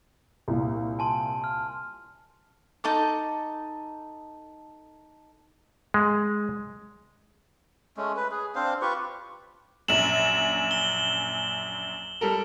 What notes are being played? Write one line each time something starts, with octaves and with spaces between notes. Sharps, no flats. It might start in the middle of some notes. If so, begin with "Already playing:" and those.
C2 A#2
G#5 A5 C6
F6
D#4 A4 D6
G#3
G#3 A3 C#4
B4
G#4
C4 D4 C5 F5
F4 G4 B4 C#6
A#1 F#2 E7 F#7
G7
G3 A4 A#4